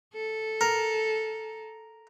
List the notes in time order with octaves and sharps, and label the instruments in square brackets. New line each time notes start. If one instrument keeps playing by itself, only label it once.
[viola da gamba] A4
[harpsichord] A#4